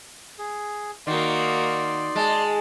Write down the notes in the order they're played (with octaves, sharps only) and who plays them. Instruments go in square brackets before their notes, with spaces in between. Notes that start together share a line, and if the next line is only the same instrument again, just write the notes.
[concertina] G#4
[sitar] D#3 [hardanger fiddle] A#3 F#4 [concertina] D5 C6
[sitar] G#3 [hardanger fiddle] A5